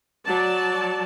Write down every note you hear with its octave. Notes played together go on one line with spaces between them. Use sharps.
F#3 D5 A5